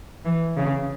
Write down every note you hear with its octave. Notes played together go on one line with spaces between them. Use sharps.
E3
C#3